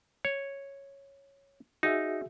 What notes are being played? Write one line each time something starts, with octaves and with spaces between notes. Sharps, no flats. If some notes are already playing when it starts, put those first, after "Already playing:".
C#5
D#4 F#4 G#4 E5